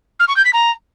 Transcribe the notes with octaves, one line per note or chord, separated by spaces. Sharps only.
F6
C#6
G6
B6
A#5